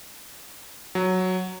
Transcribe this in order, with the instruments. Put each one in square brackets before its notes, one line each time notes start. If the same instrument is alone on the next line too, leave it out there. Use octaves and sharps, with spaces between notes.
[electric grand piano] F#3